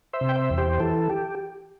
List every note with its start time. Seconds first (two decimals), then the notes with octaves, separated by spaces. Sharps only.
0.13 C5 E5
0.21 C3
0.29 G5
0.36 C5 E5
0.50 E2
0.58 G4 C5
0.80 E3 A4
1.10 G4